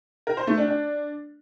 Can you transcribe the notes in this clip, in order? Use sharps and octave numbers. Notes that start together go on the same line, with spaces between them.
A#4
C5
A3
D4
D4